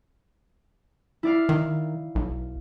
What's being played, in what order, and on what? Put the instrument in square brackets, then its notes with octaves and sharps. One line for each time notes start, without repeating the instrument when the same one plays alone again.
[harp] E4 D5 F5
[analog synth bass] D#3
B1